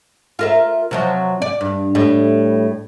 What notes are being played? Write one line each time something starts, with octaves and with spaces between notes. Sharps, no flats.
F4 A#4 E5
C3 F3 F#3
D5
G2
A2 G3